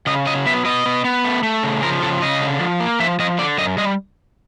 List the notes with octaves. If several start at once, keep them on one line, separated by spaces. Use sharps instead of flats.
C#3 D#5
F#3 D#5
B3 E5
B3 D#5
B3
B3
A3
A3
C#3
F3 A#4
C#3 A4
C#3 D#5
D3
F3
A#3
F3 E5
F3 D#5
D3 D5
F#2 D#5
G3 D#5